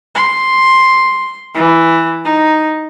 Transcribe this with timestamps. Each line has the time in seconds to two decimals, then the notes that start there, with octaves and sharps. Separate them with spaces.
0.15 C6
1.55 E3
2.25 D#4